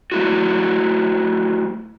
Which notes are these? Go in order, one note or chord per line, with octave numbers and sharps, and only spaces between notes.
G3 A3 E4 F#4